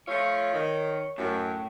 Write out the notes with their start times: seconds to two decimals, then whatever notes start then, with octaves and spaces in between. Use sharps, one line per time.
0.08 F3 A3 F4 C#5
0.53 D#3
1.18 F#2 A2